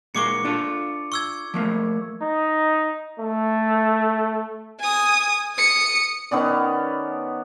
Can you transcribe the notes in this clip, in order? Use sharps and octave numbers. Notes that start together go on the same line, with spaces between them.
A#2 G#3 A#3 C#6 D6 C#7
D4 F4 A4
C#6 E6 G#6
F3 A3 A#3
D#4
A3
G#5 D#6
D#6 C#7
D#3 B3 C#4 D5